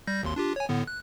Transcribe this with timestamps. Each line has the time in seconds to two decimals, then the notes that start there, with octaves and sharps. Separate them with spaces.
0.07 G3 G6 A#6
0.23 G#1 D#2 C6
0.36 D4 F4 G4
0.56 C#5 G#5
0.69 A2 D3 B3
0.87 F#6